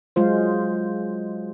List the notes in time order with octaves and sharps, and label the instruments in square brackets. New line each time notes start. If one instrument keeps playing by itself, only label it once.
[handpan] F#3 G#3 F4 C5